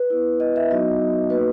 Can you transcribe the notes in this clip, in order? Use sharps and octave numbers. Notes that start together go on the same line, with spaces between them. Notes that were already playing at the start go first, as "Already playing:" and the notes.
Already playing: B4
B3 E4
D#5
E5
F#3 B3 D#4 F#4 D#5
A#3 D#4 F#4 B4